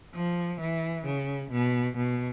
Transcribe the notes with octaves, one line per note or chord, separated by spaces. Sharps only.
F3
E3
C#3
B2
B2